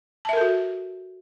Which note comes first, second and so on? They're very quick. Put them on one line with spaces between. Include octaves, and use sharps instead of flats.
A5 E5 A#4 A4 F#4